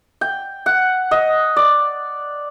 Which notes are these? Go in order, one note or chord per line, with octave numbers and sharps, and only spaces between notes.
G5
F#5
D#5
D5